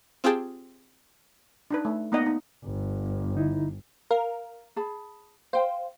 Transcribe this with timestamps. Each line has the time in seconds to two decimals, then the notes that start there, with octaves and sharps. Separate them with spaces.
0.24 C4 F4 G4 G#4 G5 A5
1.71 D4 D#4 B4
1.85 A3
2.12 A#3 B3 D#4 D5 D#5 F#5
2.26 D#4
2.65 G1
3.35 D3 D#4 E4
4.11 A#4 F5
4.76 G#4 A5 B5
5.53 C5 F5 G5